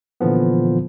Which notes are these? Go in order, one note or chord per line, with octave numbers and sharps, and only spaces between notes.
A#2 D3 E3 F3 B3